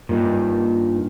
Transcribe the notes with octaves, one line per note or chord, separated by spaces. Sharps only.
G2 A#2 D#3